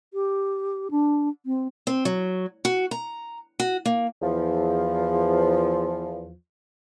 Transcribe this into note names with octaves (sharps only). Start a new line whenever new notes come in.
G4
D4
C4
C4
F#3
F#4
A#5
F#4
A#3
E2 F3